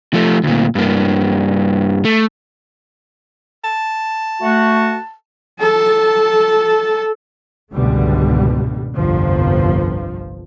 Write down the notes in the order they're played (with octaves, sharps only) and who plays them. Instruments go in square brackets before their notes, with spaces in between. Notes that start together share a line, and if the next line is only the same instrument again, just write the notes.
[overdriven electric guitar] F3 A3
D2 A#2
G2 A#3
A3
[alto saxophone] A5
[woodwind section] A3 F#4
[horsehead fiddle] A4 A5
[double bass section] G#1 C#2 B2 D3 G3 A3
G1 C2 F2 F3